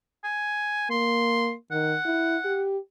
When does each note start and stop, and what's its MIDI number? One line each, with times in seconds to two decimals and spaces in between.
0.24 0.87 80
0.90 1.54 58
0.90 1.51 84
1.72 1.96 51
1.72 2.62 78
2.05 2.37 64
2.45 2.78 67